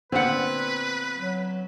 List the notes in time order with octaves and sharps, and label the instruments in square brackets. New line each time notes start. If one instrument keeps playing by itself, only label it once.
[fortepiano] A#2 D3 B3 [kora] C4 F#5 [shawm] B4
[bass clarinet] F#3